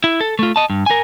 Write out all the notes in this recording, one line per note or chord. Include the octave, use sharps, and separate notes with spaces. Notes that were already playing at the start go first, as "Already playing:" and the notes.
E4
A4
A3 F4
D#5 A5
G2
A#4 G#5